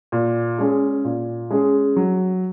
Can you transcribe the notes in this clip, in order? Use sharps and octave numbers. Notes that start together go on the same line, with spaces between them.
A#2
G#3 C#4 G#4
A#2
G#3 C#4 G#4
F#3